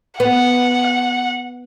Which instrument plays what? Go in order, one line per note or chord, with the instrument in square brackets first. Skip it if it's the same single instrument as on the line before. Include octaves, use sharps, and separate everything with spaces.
[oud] B3 [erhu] F#5